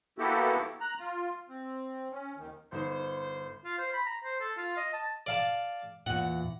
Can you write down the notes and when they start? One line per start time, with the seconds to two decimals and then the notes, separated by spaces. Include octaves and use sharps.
0.18 A#3 B3 E4 F#4 G4 A4
0.81 A#5 F#6
0.99 F4
1.49 C4
2.12 C#4
2.38 D#2 D#3
2.72 G1 D#4 C5
3.65 F4
3.78 C5
3.93 B5
4.06 A#5
4.24 C5
4.40 A4
4.57 F4
4.77 D#5
4.94 A5
5.26 D5 F5 A5
6.06 E2 A#2 F#5